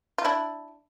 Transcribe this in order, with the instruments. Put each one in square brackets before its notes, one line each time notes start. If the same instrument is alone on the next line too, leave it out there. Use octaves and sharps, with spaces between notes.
[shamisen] F4
D4 E4